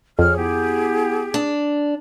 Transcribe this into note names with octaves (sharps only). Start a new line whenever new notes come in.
F2 G#4 C#5 F6
B3 E4 G4
D4